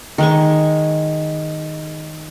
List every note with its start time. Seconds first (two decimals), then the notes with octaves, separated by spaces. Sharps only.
0.18 D#3 G#3 C#6